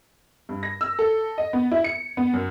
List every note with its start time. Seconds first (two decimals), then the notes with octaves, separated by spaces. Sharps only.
0.49 G2
0.63 A#6
0.81 E6
0.99 A4
1.38 D#5
1.53 B3
1.72 E4
1.84 C#7
2.17 B3
2.34 F#2